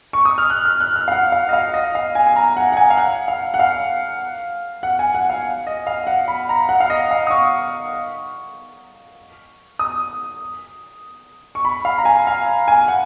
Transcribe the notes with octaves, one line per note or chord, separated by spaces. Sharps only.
C#6
D#6
F6
F#6
F6
F#6
F6
F5
F#5
F5
D#5
F5
D#5
F5
G#5
G#5
A#5
F#5
F#5
G#5
F5
F#5
F5
F#5
F5
F#5
G#5
F#5
F5
D#5
F5
F#5
B5
A#5
F#5
F5
D#5
F5
D#6
C#6
D#6
C#6
B5
F5
A#5
G#5
F5
G#5
F#5